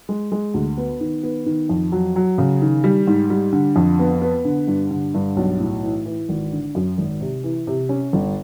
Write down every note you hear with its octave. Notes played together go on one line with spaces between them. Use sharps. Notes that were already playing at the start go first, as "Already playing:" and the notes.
G#3
G#3
D2
B3
D#3
B3
D#3
F2
F#3
F#3
C#3
D#3
G3
G#2
G3
D3
F2
B3
B3
D3
G2
D3
G2
B1
A2
E3
E3
G#1
D3
F#2
G#1
C3
E3
C3
C#4
G1